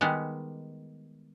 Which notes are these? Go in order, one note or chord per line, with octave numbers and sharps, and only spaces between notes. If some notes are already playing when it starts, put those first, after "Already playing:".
D#3 G3 G#3 B3